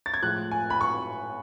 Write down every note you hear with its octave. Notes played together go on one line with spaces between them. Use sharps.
A6
G#6
A2 F3 G#3 F#6
G#5
B5
C#6